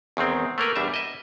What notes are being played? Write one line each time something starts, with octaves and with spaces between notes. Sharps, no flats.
E2 D#3 G#3 C4
A3 A#3 A#4 B4
E2 G3 D4 E5
D#5 E5